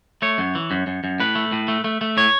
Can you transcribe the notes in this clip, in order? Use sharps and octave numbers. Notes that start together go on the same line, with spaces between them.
A3 C#5
F#2
E3
F#2
F#2
F#2
A2 B4
A3
A2
A3
A3
A3
A2 C#5